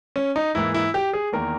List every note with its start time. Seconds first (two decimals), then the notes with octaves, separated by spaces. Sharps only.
0.16 C#4
0.36 D#4
0.55 G#2 E3 A#3 E4
0.74 E4
0.94 G4
1.13 G#4
1.32 E2 D#3 A#3 A#4